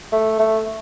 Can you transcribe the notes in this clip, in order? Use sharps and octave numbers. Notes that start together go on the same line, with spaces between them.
A3
A3